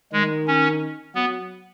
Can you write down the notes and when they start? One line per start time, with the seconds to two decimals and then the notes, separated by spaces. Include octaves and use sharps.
0.12 D#3 G#3
0.47 C#4
1.15 F#3 B3